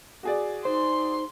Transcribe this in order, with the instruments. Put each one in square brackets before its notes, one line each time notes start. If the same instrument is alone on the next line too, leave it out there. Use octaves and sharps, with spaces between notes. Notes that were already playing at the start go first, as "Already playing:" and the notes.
[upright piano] F#4 G#4 D5
[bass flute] D#4 [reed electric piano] C5 [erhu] C6